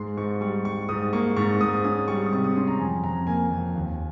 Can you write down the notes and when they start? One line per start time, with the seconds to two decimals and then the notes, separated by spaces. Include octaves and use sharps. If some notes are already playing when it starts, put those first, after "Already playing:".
Already playing: G#2 G#3 C6
0.17 G#2 C#6
0.41 G3 C#6
0.65 G3 C#6
0.89 G#2 D#6
1.13 A#3 C#6
1.37 G#2 C#6
1.61 G#2 D#6
1.84 C#4 D#6
2.08 G3 C#6
2.26 D#6
2.32 C3 C#6
2.44 D#6
2.56 C#4 C6
2.67 A#5
2.80 F2 G#5
3.04 F2 A#5
3.27 A#3 G#5
3.51 F2
3.75 D#2